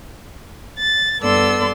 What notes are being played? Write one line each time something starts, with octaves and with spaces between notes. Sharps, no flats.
A6
G2 B3 A4 D5 C6 E6